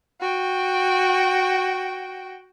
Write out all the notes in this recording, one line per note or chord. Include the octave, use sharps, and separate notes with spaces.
F#4 G5